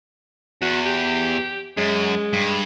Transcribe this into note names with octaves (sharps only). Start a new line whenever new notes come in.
E2 F#4
G4
F#2 G#3
G2